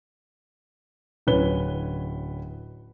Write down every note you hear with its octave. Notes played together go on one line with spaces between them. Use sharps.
D1 C#4 B4 G7